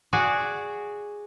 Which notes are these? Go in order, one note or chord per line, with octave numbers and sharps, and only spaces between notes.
F#4 G#4 D5